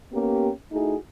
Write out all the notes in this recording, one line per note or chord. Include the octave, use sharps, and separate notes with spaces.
A#3 B3 C#4 G4
A3 D#4 E4 F#4 G#4